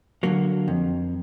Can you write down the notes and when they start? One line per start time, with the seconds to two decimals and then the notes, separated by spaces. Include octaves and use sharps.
0.23 D3 F#3 A#3
0.68 F2